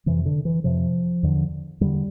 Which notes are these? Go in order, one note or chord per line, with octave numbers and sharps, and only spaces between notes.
F2 C3 E3
D3
E3
F2 C3 F3
E2 D3
E2 D3 G3